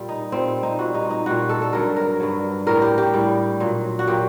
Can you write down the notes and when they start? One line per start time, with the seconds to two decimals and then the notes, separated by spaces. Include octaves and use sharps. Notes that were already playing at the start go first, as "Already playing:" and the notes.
Already playing: A#2 G3
0.09 D#4
0.32 A#2 G3 C4
0.63 D#4
0.79 A#2 G3 F#4
0.94 D#4
1.11 D#4
1.26 A#2 G3 F#4
1.49 A4
1.61 A4
1.73 G2 D3 F#3 A#4
1.96 A#4
2.20 G2 D3 F#3
2.67 A2 G3 A#4
2.82 G4
2.98 G4
3.14 A2 G3
3.60 A#2 F#3
3.99 F#4
4.07 A#2 F#3 G4